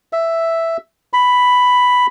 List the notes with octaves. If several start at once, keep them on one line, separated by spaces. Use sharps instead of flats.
E5
B5